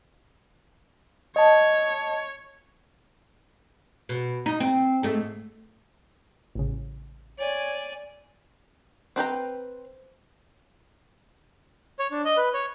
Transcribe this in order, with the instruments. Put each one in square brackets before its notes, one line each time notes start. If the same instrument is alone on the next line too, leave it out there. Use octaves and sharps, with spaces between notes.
[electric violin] C#5 [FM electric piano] D#5 A5
[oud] B2
D#4
C4
G#2 A3
[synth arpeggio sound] A1 C#3
[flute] C#5 [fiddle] D5 G#5
[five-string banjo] C4 B4 G5 A#5
[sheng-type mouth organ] C#5
D4
D#5
B4
C#5